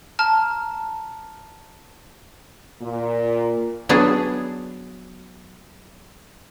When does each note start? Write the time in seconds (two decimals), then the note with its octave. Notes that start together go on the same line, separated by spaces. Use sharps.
0.19 A5 A#5 F6
2.82 A#2
3.89 F#3 B3 D4 G#4